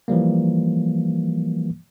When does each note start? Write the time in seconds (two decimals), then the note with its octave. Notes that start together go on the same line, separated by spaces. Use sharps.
0.08 E3 F3 G3 A#3